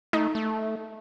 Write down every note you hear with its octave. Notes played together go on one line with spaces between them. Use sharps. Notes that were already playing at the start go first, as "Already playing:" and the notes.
A3 D#4
A3